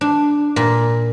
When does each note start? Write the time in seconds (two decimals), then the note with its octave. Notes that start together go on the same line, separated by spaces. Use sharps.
0.01 D4
0.56 A#2